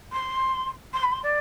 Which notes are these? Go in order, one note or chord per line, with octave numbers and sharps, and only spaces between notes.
C6
C6
B5
C6
D5